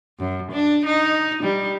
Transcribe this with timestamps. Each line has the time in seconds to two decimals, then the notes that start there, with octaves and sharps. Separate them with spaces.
0.19 F#2
0.51 D4
0.85 D#4
1.43 G3